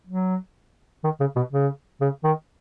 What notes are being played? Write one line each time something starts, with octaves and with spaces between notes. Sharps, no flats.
F#3
D#3
C#3
B2
C#3
C#3
D#3